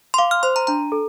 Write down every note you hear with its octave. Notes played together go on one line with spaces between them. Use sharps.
C6
F5 D6
F6
C5 C6
A#5
D4 A#5
A4